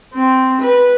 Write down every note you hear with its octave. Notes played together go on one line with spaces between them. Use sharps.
C4
B4